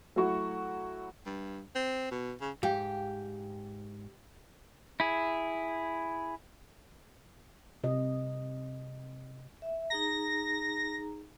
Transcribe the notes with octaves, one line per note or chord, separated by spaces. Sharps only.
F#3 A3 E4 F#4 C#6
G2
C4
B2
C#3
G#2 G4 F5 G5
E4 G#4
C3 D#5
E5
D#4 G#4 A#5 A#6